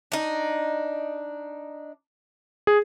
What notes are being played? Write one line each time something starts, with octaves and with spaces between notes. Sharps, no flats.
D4 D#4
G#4